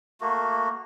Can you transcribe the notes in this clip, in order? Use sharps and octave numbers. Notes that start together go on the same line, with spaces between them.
A3 A#3 F#4